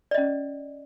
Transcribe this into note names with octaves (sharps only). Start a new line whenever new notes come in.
C#4 D5 D#5